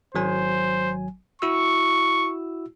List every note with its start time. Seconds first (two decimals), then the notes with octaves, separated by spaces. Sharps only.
0.15 G#1 F#3 C5 G#5
1.42 E4 F#4 C#6 E6